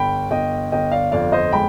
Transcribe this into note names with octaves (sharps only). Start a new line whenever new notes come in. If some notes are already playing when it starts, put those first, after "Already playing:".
Already playing: G1 G5 B5
G1 D#5 G5
G1 D#5 G5
D5 F5
F2 D5 F5
C5 D#5
G#3 G5 B5